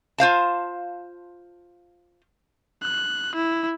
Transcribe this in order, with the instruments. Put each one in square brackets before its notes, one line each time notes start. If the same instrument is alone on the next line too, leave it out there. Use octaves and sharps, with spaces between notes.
[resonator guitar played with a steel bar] F4 C5 F5 A5
[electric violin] F#6
E4